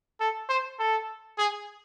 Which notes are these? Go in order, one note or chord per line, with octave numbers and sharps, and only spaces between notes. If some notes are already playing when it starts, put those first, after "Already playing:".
A4
C5
A4
G#4